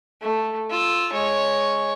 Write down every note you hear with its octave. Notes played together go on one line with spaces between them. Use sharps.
A3
F4 E6
G#3 C#5